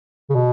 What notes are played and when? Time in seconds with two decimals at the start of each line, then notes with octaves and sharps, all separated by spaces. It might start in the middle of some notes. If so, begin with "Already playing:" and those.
0.30 C#3
0.35 B2